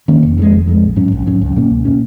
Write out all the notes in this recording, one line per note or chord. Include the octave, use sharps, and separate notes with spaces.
D#3 A#3 C#4
F1
F2 C#3 G#3
F1
F2 C#3 G#3
A#1
G#2 F#3 C#4
A#1
G#2 F#3 C#4
C#2
B2 A#3 C#4
C#2
B2 A#3 C#4